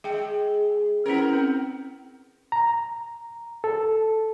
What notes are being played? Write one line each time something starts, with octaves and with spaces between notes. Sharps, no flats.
G#3 G#4 G5
B3 C#4 E4 A#4
C4
A#5
A4